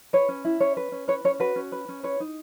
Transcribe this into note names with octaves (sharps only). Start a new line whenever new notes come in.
B4 C#5
C#4
E4
C#4 C#5
B4
C#4
B4 C#5
C#4 C#5
F#4 B4
C#4
B4
C#4
B4 C#5
D#4